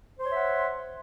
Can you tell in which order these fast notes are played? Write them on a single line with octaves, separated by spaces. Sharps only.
C5 C6 C#5 E5 F#5